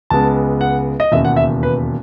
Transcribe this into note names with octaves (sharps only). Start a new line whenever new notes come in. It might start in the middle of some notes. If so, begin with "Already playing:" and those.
C#2 C#3 G#3 B3 A5
F#5
D#5
E1 D#2 C#3 E5
F#5
E5
B4